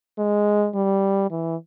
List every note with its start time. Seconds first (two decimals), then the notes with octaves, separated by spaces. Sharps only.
0.18 G#3
0.75 G3
1.31 E3